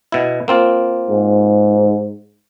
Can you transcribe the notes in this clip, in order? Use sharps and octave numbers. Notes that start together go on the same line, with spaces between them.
B2 E4
A#3 C4 F4
G#2